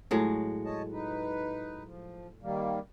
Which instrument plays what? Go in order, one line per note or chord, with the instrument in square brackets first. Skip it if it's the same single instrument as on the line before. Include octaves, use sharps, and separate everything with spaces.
[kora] A2 F#3 G#3
[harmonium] C#5 D#5 A5
D#4 B4
F3
D#3 G3 A#3